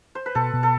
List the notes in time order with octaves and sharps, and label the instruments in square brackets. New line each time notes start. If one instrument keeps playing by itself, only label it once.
[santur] C5
B4
[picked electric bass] B2 [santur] A4
[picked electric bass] B2
[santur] A4